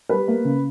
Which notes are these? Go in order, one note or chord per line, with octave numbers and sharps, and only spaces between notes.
G3 B4
A#3
C#3